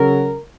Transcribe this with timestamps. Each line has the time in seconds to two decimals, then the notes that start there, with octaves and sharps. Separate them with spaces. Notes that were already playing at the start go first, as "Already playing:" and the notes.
Already playing: C#3 F#3 A#4